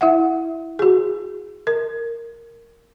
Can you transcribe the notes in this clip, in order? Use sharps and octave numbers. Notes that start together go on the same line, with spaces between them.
E4 E5 F#5
F#4 G#4
A#4